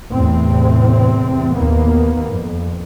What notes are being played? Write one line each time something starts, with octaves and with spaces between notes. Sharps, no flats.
E2 A2 C3 C4
D#2 A#3 B3
F2